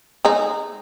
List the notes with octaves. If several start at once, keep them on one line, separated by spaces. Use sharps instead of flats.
G#3 D#4